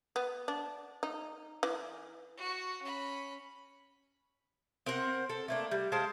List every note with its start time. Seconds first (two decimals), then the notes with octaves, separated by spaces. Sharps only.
0.16 B3
0.48 D4
1.03 D#4
1.63 E3
2.37 F#4
2.82 C#4 B5
4.86 C4 A#4 C5 F#5
5.29 A4
5.48 A3 A#3 D4
5.71 G3
5.92 G#3 C5 F5 A5